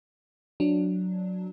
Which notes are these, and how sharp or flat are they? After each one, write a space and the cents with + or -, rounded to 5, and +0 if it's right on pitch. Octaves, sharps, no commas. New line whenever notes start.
F#3 -5 D4 +0